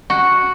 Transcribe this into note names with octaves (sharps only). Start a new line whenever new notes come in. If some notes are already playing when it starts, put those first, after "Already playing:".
F#4